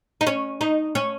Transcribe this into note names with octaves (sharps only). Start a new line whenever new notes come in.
D#4
C#4
D#4
C#4